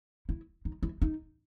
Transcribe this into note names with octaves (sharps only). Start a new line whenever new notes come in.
E4
D#4
E4
D#4